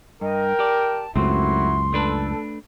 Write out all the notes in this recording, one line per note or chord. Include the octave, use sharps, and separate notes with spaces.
G2 A#4 D#5 G5
G4 D5 A5
C#2 F#2 F#3 A3 C4 E4 F#4 C6
A3 D4 A4 B4